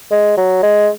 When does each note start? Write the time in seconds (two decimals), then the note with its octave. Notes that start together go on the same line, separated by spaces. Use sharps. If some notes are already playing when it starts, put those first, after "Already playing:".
0.11 G#3
0.37 F#3
0.62 G#3